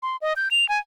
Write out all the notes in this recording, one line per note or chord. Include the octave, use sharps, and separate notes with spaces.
C6
D#5
G6
F7
G#5